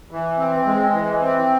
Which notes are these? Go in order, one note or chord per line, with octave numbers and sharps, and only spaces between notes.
E3
C4
G#3
E3
C4